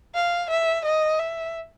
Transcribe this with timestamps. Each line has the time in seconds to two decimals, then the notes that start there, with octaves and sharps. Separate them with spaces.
0.15 F5
0.50 E5
0.85 D#5
1.19 E5